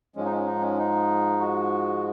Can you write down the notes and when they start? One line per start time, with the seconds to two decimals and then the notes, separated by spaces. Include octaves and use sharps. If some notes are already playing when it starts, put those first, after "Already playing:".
0.16 G#2 F3 G#3 C#4
0.26 D#4
0.31 C#4
0.47 D#4
0.62 C#4
0.78 D#4
1.40 F#4